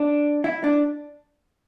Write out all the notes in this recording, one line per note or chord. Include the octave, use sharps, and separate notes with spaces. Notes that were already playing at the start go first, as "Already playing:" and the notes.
Already playing: D4
E4
D4